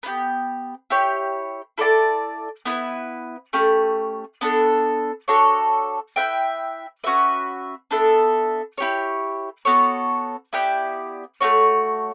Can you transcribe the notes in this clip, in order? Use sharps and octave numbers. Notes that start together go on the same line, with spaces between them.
B3 E4 G4
E4 G4 C#5
E4 A4 D5 A5
B3 E4 B4
A3 C#4 G4
B3 D4 A4
D4 F#4 A4 C#5
E4 B4 E5 G5
C#4 F#4 B4 E5
B3 D4 A4 E5
E4 G4 C#5
B3 F#4 A4 C#5
B3 E4 G4 D5
A3 C#4 F#4 C#5